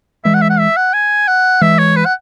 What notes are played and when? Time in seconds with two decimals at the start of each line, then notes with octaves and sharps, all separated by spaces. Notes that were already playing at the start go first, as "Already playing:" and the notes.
0.24 E3 G#3 E5
0.34 F#5
0.42 E5
0.50 F#5
0.59 E5
0.77 F#5
0.93 G#5
1.28 F#5
1.61 E3 G#3 E5
1.78 C#5
1.96 B4
2.05 F#5